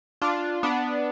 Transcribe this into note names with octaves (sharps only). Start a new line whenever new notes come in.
D4 F4
B3 D4